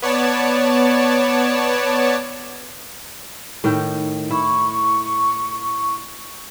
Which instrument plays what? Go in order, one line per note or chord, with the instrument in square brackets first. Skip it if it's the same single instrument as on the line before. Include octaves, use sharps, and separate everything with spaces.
[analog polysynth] B3 C#5 D5 A5
[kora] A2 D#3 G5
[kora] E4 [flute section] C#6